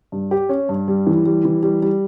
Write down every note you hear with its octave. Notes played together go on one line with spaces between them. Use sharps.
G2
G4
C#4
G2
G3
E3
G3
E3
G3
G3